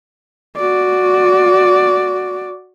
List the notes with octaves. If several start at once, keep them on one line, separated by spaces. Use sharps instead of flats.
F#4 D5